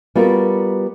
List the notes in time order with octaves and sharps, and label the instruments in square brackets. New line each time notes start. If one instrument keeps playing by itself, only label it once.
[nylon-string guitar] G3 B3 F4 F#4 A#4